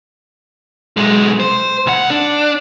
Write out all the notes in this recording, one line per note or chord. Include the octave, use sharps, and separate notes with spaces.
B1 G#3
C5
C#2 F#5
D4